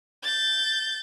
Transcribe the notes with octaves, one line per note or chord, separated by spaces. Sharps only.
G6 A6